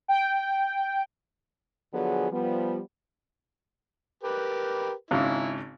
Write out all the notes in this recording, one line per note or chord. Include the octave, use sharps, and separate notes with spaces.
G5
D3 F3 F#3 B3 G#4
F3 G3 B3
G4 A#4 B4
G#1 G#2 C#3 E4